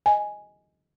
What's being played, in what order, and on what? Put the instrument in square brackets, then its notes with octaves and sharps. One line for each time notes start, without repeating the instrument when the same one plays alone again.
[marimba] D#5 G#5